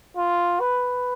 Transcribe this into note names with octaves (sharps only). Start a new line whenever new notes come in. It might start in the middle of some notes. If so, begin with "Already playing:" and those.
F4
B4